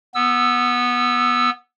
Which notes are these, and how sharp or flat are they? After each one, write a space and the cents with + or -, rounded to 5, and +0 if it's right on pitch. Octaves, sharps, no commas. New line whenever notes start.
B3 -10 E6 +0